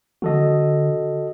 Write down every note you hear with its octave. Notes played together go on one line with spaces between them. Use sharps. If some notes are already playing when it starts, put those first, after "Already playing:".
D3 F#4 A4 D#5